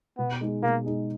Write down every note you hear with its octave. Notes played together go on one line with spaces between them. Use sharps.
B2 B3
G#3 D#4 G#4
B2 A#3
G#3 D#4 G#4